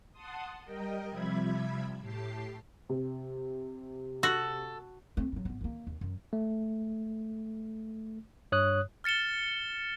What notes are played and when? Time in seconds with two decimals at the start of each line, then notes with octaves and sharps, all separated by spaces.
0.12 F#5 A5 C6 D#6
0.65 G3 A#4 D#5 G5
1.10 C3 F3 G3 E5 B5 G#6
2.00 A2 G4 A5 C7
2.89 C3
4.23 F#4 A4
5.17 A3 C4
5.32 F#3 G3
5.45 G#1 B3
5.61 D#3 A#3
5.87 D#2
6.01 F#2
6.33 A3
8.52 G2 C#5 D#6 F#6
9.04 F6 A6 C#7 E7 G7